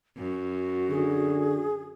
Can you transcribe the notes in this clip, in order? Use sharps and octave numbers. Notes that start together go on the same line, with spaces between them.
F#2 F#4
D3 G#4